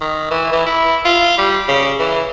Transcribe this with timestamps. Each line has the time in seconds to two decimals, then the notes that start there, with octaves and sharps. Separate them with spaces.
0.01 D#3
0.31 E3
0.52 E3
0.66 E4
1.05 F4
1.38 G3
1.68 C#3
1.99 E3